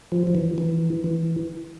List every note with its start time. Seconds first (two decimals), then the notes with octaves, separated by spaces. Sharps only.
0.12 F3
0.27 F3
0.35 E3
0.58 E3
1.04 E3